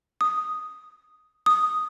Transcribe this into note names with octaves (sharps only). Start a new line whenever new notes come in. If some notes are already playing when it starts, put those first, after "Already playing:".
D#6
D#6